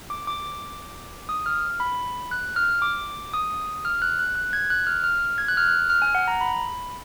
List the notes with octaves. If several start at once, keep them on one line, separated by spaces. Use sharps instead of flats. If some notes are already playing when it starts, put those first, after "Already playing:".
D6
D6
D#6
F6
B5
F#6
F6
D6
D#6
F6
F#6
F#6
F#6
G#6
F#6
F6
F6
G#6
F#6
F6
F#6
F6
G#5
F#5
A#5
B5